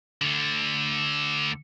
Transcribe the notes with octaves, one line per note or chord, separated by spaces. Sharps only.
D2 D3